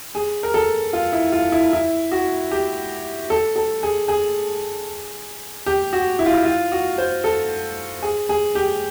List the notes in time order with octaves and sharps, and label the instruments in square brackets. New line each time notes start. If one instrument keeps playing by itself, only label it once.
[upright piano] G#4
A#4
A4
F4
E4
F4
E4
E4
F#4
G4
A4
A4
G#4
G#4
G4
F#4
E4
F4
E4
F4
F#4
C5
A4
G#4
G#4
G4